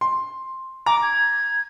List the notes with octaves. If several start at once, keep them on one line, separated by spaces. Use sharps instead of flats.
C6
A#5 D6
G#6